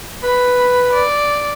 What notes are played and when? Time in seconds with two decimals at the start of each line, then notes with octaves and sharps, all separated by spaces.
0.24 B4 B5
0.93 D5